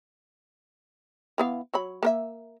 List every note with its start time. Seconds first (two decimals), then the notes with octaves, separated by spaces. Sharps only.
1.38 E3 B3 F5
1.74 F#3 C#5 B5
2.03 A#3 A#4 E5